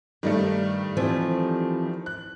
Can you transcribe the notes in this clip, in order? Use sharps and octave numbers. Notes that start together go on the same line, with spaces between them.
G2 D#3 G3 A3
E3 F3 C4
F#6